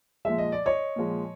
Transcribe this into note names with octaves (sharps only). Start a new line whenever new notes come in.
A#2 F3 G#3 E5
D#5
D5
C#5 D#5
A#2 F3 G#3